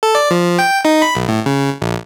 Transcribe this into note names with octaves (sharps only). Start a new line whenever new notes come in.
A4
D5
F3
G5
D#4
B5
B1
A2
C#3
A#1